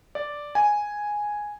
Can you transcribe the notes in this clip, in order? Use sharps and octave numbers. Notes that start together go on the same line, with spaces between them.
D5
G#5